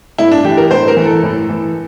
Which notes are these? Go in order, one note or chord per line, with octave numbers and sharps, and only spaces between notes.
A2 E4
D4
E3 G4
A#4
A2 C5
A#4
E3
A4
A2
E3